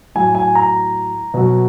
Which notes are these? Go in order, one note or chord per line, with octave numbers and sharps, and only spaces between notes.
A2 F#3 G#5
G#5
A#5
B2 F#3